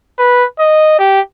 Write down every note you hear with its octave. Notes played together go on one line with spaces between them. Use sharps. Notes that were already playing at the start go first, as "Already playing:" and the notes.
B4
D#5
G4